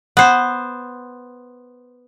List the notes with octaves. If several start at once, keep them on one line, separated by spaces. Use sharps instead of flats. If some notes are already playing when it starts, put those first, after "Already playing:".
B3 C5